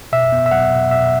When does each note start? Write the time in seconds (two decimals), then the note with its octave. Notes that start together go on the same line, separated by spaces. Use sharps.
0.12 B2 E5
0.32 B3
0.46 E5
0.51 F#3 F#5
0.71 B2
0.91 B2 E5